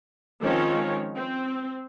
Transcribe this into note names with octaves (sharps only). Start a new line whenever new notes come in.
D#3 F3 G#3 C4 C#4 C#5
C4